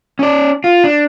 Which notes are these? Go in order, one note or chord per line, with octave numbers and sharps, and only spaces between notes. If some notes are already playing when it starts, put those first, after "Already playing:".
C#4 D5
F4
D4